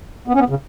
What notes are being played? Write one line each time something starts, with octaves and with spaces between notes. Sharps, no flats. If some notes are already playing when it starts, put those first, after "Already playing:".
B3
C#4
B3
C#3